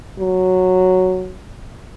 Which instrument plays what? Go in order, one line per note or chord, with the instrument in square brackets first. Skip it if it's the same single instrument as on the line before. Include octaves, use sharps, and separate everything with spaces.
[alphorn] F#3